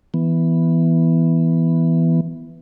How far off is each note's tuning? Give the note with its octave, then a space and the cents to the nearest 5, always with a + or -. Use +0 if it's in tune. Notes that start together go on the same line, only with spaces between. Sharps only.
E3 +0 B3 +0